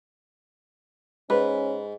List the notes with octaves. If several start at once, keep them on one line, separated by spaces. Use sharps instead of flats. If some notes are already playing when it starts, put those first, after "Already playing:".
G#2 C#4 B4